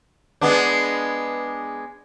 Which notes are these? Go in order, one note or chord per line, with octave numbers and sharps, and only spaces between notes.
G#3 B3 D4